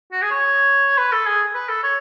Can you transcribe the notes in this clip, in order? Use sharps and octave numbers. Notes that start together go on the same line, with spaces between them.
F#4
G#4
C#5
B4
A4
G#4
B4
A4
C#5